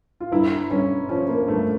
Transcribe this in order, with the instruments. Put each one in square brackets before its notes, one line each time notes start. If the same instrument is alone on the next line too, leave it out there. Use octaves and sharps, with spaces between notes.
[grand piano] F4
[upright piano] G1 [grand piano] E4
[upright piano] G1 [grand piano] C#4
[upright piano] F3 [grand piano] C#4
[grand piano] A#3
[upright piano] G1 [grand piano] A3